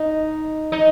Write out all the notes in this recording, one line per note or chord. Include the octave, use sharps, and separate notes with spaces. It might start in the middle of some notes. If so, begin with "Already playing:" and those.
Already playing: D#4
D#4